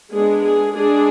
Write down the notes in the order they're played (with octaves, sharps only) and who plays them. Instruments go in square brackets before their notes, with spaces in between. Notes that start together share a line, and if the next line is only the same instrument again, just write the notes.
[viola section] G#3 B3 D4 G#4
G#4
G#3 D4 G#4